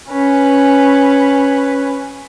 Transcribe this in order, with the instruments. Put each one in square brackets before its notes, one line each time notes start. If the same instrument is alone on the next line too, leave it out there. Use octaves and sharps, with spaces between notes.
[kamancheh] C#4 B4